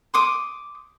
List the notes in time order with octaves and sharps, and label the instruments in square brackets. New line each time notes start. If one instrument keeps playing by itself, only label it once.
[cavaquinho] C6 D6 D#6